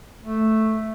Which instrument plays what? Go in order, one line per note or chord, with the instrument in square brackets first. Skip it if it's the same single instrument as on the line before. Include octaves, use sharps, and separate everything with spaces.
[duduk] A3